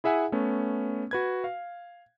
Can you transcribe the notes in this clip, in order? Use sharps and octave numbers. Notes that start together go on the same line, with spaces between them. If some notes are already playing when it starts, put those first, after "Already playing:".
E4 G#4 E5 F#5 G#5
A3 B3 C#4
F#4 B4 G#6
F5